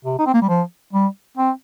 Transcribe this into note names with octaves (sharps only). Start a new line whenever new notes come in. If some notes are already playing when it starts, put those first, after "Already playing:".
C3
D#4
C4
A#3
G3
F3
G3
C4